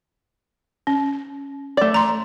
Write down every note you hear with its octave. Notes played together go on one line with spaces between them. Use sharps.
C#4
A3 D5
A#5 C6